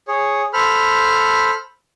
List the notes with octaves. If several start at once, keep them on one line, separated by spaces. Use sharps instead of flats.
G#4 C#5
A4 C5 B5 F6